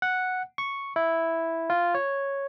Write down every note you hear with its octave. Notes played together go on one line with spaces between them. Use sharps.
F#5
C#6
E4
F4
C#5